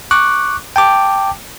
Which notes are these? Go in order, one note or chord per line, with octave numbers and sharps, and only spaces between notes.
C#6 D6 F#6
G5 A5 D6